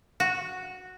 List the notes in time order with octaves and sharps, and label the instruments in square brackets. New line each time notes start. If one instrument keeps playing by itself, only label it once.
[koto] F#4